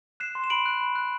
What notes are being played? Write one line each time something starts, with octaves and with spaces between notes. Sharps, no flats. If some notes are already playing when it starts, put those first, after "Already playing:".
F#6 C7 E7
C6
E7
B5 D7 F#7
F#6
B5
F#6